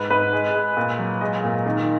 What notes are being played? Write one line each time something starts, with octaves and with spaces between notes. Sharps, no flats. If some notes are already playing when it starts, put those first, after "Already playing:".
Already playing: G#2 B4
G#2 B4
G#3
G#3
A#2
F#3
G#3 D#5
A#2
D#3